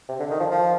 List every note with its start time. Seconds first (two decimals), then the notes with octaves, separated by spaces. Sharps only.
0.09 C3
0.20 D3
0.30 D#3
0.40 F3
0.51 F3